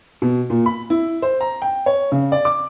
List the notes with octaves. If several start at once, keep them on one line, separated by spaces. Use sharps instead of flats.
B2
A#2
B5
E4
C5
A#5
G5
C#5
C#3
D5
D6